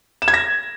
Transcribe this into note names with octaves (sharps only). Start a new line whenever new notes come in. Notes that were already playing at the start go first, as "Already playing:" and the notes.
E7
G#6
A#6